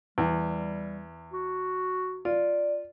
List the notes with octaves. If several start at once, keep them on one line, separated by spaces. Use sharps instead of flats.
E2 G3
F#4
F4 D5